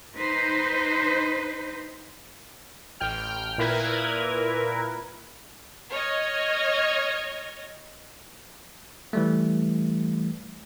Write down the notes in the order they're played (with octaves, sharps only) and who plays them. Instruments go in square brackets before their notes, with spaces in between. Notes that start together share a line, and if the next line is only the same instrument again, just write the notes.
[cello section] D#4 B4 C5
[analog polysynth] A1 G5 F6
A#2 E4 A#4 B4 G#6
[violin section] C#5 D#5 F6 G#6
[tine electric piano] E3 G3 A3